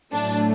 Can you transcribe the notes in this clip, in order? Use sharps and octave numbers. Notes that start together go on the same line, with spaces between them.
A2 F#3 A3 D4